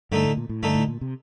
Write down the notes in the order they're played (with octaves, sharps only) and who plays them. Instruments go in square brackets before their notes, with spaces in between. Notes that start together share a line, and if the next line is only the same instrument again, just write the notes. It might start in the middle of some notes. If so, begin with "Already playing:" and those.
[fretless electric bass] G2 [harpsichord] D3 A3 D#4 A4
[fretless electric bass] A2
A#2
A2
[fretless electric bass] G2 [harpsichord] D3 A3 D#4 A4
[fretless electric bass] A2
A#2
C3